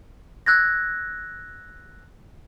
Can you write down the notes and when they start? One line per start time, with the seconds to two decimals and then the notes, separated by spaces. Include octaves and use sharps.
0.46 E6 F#6 G#6 A#6